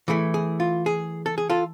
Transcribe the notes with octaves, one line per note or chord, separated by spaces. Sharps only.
E3 A3 E4 G#4
G#4
F4
G#4
A4
G#4
F4 A4